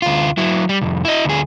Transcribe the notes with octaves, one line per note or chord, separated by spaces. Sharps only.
D2 F4
F#3 E4
G3
C2 F2
E4 D#5
D2 G#4